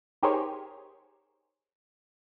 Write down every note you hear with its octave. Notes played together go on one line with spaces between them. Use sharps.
D#4 G4 G#4 A#4 C5 C#5